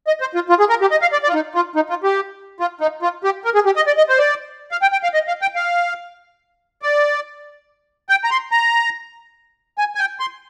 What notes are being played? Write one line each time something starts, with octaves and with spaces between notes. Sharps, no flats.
D#5
C5
F4
F4
G#4
A#4
G4
D#5
F5
D5
D5
F4
D#4
F4
D#4
F4
G4
F4
D#4
F4
G4
A#4
G#4
G4
D#5
D5
D#5
C5
D5
F5
G5
G5
F5
D#5
F5
G5
F5
D5
G5
A#5
C6
A#5
G#5
G#5
G5
C6